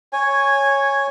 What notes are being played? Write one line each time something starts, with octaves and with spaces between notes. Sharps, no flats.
C#5 G#5